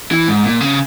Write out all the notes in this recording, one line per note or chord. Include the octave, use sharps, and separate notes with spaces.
E3
G#2
A#2
C#3